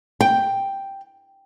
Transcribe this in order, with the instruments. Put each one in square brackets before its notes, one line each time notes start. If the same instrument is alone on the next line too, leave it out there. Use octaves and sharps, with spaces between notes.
[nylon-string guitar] G5